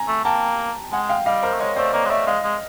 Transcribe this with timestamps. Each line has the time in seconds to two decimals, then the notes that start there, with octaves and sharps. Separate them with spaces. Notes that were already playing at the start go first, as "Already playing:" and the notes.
Already playing: G#5 A#5
0.08 A3
0.25 A#3 G5 A5
0.92 G#3 F#5 G#5
1.09 F5 G5
1.26 G3 D#5 F5
1.43 A#4 C5
1.53 A3
1.60 G#3 C#5 D#5
1.76 A3 C5 D5
1.93 A#3 C#5 D#5
2.06 G#3
2.10 A3 D5 E5
2.27 G#3 D#5 F5
2.44 G#3